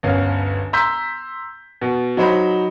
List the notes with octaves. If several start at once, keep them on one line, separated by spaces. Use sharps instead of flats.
G1 D2 C#4 F5
A#5 C6 E6 G6 B6
B2
F#3 D#4 C5 B5